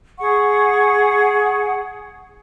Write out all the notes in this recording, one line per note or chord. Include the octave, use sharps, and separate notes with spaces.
G#4 F#5 C#6